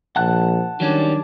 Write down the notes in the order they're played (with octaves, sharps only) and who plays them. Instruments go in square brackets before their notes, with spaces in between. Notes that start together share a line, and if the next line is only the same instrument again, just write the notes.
[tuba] A#1 [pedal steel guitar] F#5 A5 F#6
[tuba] D#3 [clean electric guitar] F#3 G3 C#4 [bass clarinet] D4